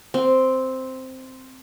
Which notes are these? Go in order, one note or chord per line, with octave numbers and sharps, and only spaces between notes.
C4